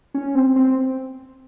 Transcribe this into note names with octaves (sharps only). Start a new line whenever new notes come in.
C#4
C4
C4